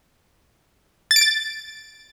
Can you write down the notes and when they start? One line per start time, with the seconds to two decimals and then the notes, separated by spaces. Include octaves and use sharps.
1.11 A6
1.16 D7
1.21 A6